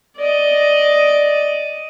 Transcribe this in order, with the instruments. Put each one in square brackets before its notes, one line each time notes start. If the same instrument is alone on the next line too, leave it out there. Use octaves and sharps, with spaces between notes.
[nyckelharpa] D5 D#5